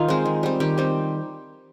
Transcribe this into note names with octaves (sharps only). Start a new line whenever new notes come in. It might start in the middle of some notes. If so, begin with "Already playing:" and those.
Already playing: D#3 D#4 F4
G#3 C4
D#3
G3 C4
D#3 G4
G3 C4